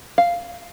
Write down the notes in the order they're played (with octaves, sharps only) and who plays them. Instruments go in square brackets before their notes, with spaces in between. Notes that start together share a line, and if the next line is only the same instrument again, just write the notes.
[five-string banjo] F5